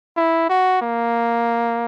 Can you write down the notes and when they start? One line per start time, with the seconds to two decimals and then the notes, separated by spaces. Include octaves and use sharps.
0.17 E4
0.50 F#4
0.82 A#3